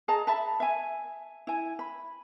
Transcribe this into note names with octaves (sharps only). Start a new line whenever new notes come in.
G#4 D#5 A5 A#5
E5 A5 B5
E5 G#5
E4 G#5
B5